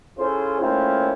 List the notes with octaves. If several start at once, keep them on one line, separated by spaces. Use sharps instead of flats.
C#4 E4 F4 G#4 A4 C5
A3 A#3 C4 C#4 E4 F4